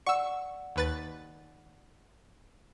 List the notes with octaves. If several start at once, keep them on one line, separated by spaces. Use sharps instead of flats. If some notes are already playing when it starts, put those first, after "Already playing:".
D5 F#5 C#6 E6
D#2 B4 A6